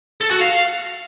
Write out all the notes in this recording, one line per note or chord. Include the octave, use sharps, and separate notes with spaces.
A4
F#4
F5